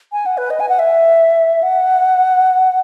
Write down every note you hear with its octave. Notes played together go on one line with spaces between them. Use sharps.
G#5
F#5
B4
D#5
G#5
F#5
E5
F#5